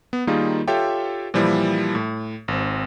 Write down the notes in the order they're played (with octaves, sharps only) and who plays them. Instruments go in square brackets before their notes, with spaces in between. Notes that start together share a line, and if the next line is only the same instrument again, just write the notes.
[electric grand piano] B3
D#3 G3 A#3 D#4 F4 G#4
F4 G4 A4 C#5 E5 G5
A#2 E3 F3 G3 E4
A2
G#1 C4